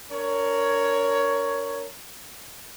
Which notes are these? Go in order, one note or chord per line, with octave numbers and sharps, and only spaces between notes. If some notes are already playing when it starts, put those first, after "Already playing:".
D4 A#4 C#5